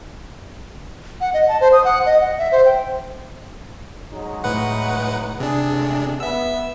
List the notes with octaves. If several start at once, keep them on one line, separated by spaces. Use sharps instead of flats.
F#5
D#5
A5
C5
D#6
F#5
D#5
F#5
E5
C5
G5
F#3 G#3 D#4
A2 B4 F#5
C3 D4 G#4
A1 G#3 G#4
B3 E5 E6